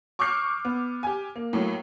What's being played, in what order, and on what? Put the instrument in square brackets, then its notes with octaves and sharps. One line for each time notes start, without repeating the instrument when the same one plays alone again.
[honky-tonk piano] C#6 D6 E6 F6 G6 C7
B3
G4 G#5
A#3
A2 F#3 A#3